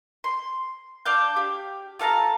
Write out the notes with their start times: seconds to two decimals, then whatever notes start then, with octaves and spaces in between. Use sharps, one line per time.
0.24 C6
1.05 D4 F5 G6
1.36 G4
1.99 F4 A4 F5 A#5